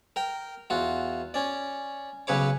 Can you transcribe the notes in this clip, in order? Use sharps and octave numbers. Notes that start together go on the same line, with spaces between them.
A#4 G5
E2 F4 F#4
C#4 D5
B1 C#3 B4 C#5 D6